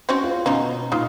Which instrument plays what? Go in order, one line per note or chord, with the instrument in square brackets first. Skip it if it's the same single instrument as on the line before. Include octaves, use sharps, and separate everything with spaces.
[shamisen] C4 C#4 F#4
[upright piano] F4
[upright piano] B2 B3 [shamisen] C#4 D#4 F4
[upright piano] A#2 F6 [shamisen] D#4 F4